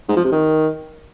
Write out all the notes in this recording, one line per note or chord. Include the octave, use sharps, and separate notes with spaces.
G#2
F3
C3
D#3